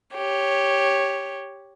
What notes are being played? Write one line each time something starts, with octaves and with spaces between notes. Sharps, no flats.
G4 C#5